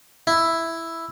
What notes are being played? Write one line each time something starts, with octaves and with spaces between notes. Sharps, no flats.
E4